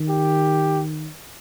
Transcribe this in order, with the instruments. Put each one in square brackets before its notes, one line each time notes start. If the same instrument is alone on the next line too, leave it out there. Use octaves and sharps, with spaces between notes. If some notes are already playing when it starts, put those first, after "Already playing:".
Already playing: [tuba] D#3
[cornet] G4